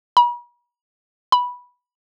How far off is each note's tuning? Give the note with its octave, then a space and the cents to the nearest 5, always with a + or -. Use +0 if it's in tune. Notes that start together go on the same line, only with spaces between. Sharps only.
B5 -45
B5 -10